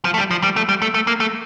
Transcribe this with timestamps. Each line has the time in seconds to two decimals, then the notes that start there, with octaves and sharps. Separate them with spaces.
0.05 F3
0.14 A3
0.18 G3
0.31 F3
0.43 G3
0.56 A3
0.69 G3
0.82 A3
0.94 A3
1.07 A#3
1.20 A3